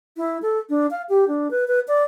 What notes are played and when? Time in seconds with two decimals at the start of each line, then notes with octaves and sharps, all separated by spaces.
0.17 E4
0.42 A4
0.69 D4
0.91 F5
1.09 G4
1.28 D4
1.51 B4
1.68 B4
1.88 D5